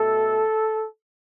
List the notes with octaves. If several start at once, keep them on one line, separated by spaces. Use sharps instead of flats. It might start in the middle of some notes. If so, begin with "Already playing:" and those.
Already playing: B2 A3 A4